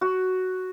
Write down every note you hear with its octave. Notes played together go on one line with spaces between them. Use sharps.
F#4